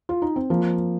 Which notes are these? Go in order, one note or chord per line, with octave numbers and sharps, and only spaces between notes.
F4
D#4
C4
F3 A#3